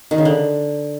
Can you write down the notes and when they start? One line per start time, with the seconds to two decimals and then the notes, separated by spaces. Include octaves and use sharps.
0.11 D#3
0.18 C#3
0.25 D3